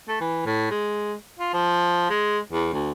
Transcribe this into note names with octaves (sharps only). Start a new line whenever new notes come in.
A3
E3
A2
G#3
F4
F3
G#3
E2
D2